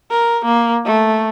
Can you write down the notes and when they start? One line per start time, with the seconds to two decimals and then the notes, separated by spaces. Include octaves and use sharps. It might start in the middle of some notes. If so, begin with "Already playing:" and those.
0.11 A#4
0.45 A#3
0.86 A3